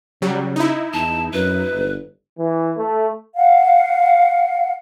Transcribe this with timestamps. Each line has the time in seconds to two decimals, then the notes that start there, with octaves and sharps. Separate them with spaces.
0.22 C#3 F#3 G3
0.56 D#4 E4
0.93 E2 A5
1.33 F#2 B4
1.73 G1
2.39 E3
2.77 A3
3.36 F5 F#5